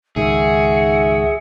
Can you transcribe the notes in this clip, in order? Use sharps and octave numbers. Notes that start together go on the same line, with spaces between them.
C#2 G#2 D#3 F#4 G#4 E5 C#7